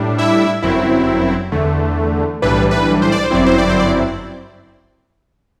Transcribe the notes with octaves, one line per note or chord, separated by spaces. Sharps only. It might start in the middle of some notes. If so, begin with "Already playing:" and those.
Already playing: A2 G3 D4
E4 E5
G1 F#2 F#3 C4 E4
E2 D3 A3
B1 A2 E3 G3 D4 B4
B4
C5
D5
C5
G1 F#2 F#3 C4 E4 D5
C5
D5
C5
D5